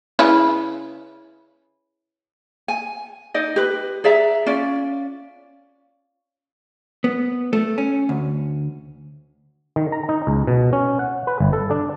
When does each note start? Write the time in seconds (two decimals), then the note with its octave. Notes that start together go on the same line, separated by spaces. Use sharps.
0.19 C#3 E4 B4
2.68 G#5
3.34 D#4 D5 D#5
3.56 G4 B4
4.04 G#4 D5 E5 A#5
4.46 C#4 F4 D5
7.04 B3
7.53 A3
7.78 C#4
8.09 D2
9.76 D#3
9.92 A#5
10.09 D#4
10.27 C#2
10.47 B2
10.73 C#4
10.99 F#5
11.27 B4
11.40 G1
11.53 A4
11.71 D4